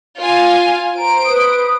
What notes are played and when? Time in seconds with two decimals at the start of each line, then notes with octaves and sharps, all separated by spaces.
0.20 F4 F5 G#5
0.97 C5 A#5 D7
1.26 B4 D#6